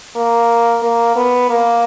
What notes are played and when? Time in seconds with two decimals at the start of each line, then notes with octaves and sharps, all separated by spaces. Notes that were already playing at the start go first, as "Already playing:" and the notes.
0.16 A#3
0.82 A#3
1.16 B3
1.49 A#3